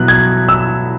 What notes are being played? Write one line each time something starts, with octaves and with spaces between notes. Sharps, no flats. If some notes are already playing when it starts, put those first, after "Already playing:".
Already playing: B2 F#3 B3 E4 F#6
G#6
E6